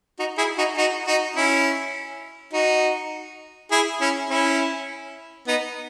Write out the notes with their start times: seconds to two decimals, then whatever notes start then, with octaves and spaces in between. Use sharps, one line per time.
0.19 D#4 F#4
0.38 E4 G#4
0.58 D#4 F#4
0.77 D#4 F#4
1.06 D#4 F#4
1.36 C#4 E4
2.53 D#4 F#4
3.71 E4 G#4
4.00 C#4 E4
4.30 C#4 E4
5.47 B3 D#4